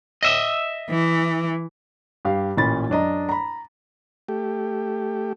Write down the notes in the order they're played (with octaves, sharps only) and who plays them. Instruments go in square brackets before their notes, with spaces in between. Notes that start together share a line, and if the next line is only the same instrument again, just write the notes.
[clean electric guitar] D#5 E5
[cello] E3
[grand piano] G2 G4 F5
A1 A#2 C#4 B5 A6
F#2 D4 D#5 A#5
A#5 B5
[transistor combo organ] A3 G4